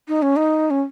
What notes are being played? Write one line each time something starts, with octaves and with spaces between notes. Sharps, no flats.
D#4
C#4
D#4
C#4